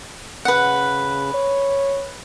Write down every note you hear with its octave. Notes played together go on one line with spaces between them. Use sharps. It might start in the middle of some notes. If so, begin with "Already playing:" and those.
C#3 B4 F#5
C#5